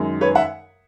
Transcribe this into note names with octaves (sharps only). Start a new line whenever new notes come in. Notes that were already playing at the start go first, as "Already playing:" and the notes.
Already playing: F#2 D#3 G#3
B4 C#5
E5 F#5